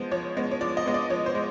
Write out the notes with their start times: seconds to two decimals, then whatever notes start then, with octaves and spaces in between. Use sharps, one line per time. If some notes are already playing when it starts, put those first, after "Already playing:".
Already playing: F3 G#3 B3 C5
0.11 F3 C#5
0.37 G#3 B3
0.51 C#5
0.61 F3 D5
0.77 D#5
0.86 G#3 B3
0.94 D5
1.10 F3 C#5
1.26 C5
1.35 G#3